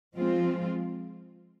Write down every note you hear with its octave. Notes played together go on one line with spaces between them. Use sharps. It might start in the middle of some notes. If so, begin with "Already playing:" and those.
F3 G#3 C4 F4